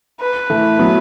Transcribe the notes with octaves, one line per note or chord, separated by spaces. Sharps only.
B4
E3 A3
F#3 B3